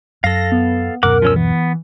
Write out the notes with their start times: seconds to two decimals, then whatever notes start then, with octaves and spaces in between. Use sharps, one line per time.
0.24 F#2 A4 F5 A#6
0.52 B3
1.03 D1 F#2 B2 A#4 F#5 D6
1.22 F3 C#4 E6
1.36 E3 B3